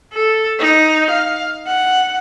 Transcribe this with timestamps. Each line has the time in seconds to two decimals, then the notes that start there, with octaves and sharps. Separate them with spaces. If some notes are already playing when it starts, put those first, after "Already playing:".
0.14 A4
0.60 D#4
1.10 F5
1.67 F#5